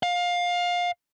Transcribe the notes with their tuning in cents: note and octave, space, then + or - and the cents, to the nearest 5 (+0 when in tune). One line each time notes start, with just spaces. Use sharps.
F5 +20